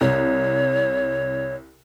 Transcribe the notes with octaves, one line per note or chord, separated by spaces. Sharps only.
C2 C#5